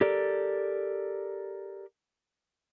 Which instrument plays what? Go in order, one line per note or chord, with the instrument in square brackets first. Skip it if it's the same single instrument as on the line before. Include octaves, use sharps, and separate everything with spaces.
[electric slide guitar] G4 A4 A#4 D5